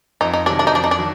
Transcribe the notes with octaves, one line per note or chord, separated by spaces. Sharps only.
F2 D#4
D#4
C3 D#3 F#3 D4
D4
D#4
F2 D4
D#4
D4
D#3 F#3